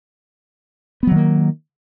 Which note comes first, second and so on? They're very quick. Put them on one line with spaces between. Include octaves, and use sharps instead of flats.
B3 F#3 D#3 A#3